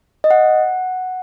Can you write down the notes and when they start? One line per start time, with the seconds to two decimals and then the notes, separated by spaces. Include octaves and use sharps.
0.24 D#5
0.31 F#5